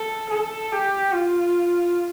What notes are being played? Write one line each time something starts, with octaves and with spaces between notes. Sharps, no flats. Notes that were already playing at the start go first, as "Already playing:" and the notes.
Already playing: A4
A4
G4
F4